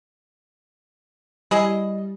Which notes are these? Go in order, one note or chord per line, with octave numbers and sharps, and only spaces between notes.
G3 E4 G#4 D#5